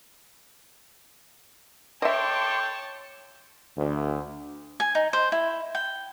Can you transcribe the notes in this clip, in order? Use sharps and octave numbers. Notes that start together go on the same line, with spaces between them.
A4 C#5 D#5 E5 G5 A5 C6 D6
D2
G#5
D#4
C5
E4
G5